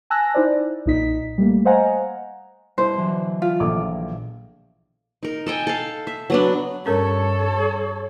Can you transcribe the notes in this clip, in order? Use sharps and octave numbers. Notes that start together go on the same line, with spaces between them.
G#5 A5 E6 F#6 A#6
D#4 E4 C5 D5
B1 A#2 D#4 D#5 B6
G3 A3 A#3
C5 D#5 F5 F#5 G#5 A#5
G2 B2 E4 C5
D3 E3 F#3
F4
A#1 A4 D6
D#4 A#4
A4 D#5 G5 G#5
A4 F5
E5
F#3 B3 D4
G2 C#4 A4 A#4 C#5